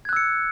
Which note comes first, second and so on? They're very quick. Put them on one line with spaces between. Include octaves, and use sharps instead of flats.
G#6 F#6 E6 C#7